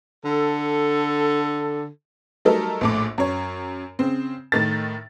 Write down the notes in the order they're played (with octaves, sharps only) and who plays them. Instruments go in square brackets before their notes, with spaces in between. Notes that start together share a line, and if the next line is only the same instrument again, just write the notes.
[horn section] D3 A4
[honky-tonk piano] F#3 G3 A3 D#4 A4 A#4
A#1 A2 D6
F#2 C#5
C#3 C4
A2 D#3 A6